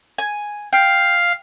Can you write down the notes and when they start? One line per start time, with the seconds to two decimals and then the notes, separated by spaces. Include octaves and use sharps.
0.18 G#5
0.73 F5 G5